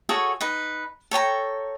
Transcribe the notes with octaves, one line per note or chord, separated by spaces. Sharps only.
F#4 G#4 A4 C#5
D#4 B4
A4 C#5 G5 A#5